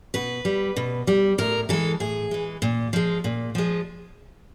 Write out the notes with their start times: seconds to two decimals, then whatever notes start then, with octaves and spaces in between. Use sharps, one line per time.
0.14 B2 B4
0.45 G3
0.76 B2
1.07 G3
1.38 A2 A#4
1.69 E3 G#3 A4
2.00 A2 G#4
2.31 E3 G#3
2.62 A#2
2.93 F3 G#3
3.24 A#2
3.55 F3 G#3